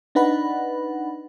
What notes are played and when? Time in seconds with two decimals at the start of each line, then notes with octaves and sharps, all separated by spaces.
0.15 D4 D#4 B4 F#5 B5